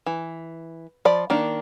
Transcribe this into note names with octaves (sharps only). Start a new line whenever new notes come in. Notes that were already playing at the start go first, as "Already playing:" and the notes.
E3
F3 D5 B5
D#3 A#3 D4